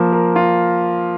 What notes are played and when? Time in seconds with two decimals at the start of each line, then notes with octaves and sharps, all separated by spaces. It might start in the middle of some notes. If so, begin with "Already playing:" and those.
Already playing: F3 A#3 F4
0.12 A#4
0.36 F4